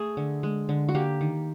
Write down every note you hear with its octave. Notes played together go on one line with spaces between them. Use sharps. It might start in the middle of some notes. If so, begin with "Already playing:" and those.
Already playing: A3 G#4
D3
G#3
D3
F#4
A#3 G4
D#3